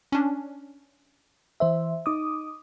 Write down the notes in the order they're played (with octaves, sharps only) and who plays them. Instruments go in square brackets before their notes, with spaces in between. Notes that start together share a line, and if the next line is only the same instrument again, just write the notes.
[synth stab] C#4 D4
[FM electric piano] E3 C5 E5
D#4 D6 D#6